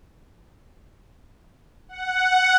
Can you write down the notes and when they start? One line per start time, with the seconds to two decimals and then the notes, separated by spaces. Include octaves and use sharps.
1.89 F#5